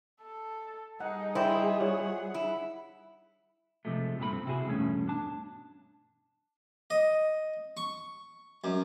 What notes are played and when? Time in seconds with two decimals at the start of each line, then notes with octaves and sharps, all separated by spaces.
0.22 A4
1.00 G3 D#4 G#4 F#5
1.35 D#4 E4 C5 D5 G5
1.80 F4 C#5 F#5
2.34 E4
3.85 C3 F3 G#3 A3
4.19 G2 A#2 A3 G4 B5
4.33 C4
4.46 C3 E4 F#4 G#4
4.66 E2 G2 B2 A3 C#4
5.08 D4 A5
6.90 D#5
7.77 C#6
8.64 F#2